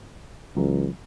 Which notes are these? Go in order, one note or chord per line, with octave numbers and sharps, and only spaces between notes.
C#2 E3 F#3